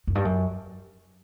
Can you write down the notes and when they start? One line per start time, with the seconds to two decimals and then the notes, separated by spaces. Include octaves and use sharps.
0.07 F#2
0.15 G2
0.25 F#2